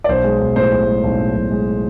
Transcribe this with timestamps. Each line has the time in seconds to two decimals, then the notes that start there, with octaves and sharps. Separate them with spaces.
0.04 D5
0.09 B1 C5
0.24 G#3
0.40 B1
0.56 A2 C5
0.72 B1
0.87 G#3
1.04 B1
1.19 A2
1.36 B1
1.51 G#3